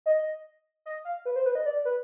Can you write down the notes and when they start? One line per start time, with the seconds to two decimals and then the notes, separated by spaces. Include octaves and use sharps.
0.06 D#5
0.86 D#5
1.05 F5
1.25 B4
1.36 C5
1.45 B4
1.55 D#5
1.66 D5
1.85 B4